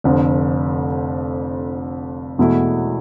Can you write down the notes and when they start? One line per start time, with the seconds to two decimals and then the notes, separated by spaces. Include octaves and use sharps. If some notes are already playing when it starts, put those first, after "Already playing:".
0.04 F1 F2 D3
2.38 E1 E2 B2 A3 E4